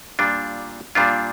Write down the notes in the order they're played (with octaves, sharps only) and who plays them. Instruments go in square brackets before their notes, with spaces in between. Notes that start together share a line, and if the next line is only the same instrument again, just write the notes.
[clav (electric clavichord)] A#2 G3 D4 F4
A#2 G3 D4 F4